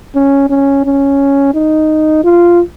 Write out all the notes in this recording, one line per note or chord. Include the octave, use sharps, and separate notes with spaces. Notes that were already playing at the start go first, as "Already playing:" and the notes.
C#4
C#4
C#4
D#4
F4